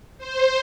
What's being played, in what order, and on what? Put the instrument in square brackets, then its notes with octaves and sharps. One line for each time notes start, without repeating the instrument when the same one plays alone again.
[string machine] C5